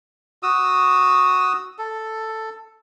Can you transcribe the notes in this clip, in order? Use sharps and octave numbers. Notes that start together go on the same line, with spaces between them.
F#4 D#6 E6
A4